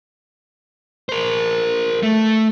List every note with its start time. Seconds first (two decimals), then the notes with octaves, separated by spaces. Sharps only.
1.09 A#4 C5
2.03 A3